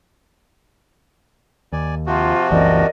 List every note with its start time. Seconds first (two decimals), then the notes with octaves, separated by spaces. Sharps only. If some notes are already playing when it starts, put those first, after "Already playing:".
1.73 D#2 D5 G#5
2.06 C3 F3 F4 F#4
2.51 F#1 C2 E3 A#4 D5 D#5